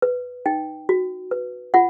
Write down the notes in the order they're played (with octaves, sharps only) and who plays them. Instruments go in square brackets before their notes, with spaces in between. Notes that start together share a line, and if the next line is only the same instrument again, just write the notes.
[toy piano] B4
D#4 G5
F#4
B4
F4 F#5